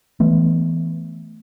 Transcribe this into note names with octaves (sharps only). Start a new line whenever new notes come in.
E3 A3 B3